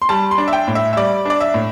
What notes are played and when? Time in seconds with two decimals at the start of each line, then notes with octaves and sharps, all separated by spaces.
0.02 C6
0.09 G3 A5
0.31 C6
0.38 D4
0.48 E5
0.53 G5
0.67 A2
0.75 E5
0.93 E5
0.96 G3 D5
1.25 D4 D5
1.40 E5
1.54 A2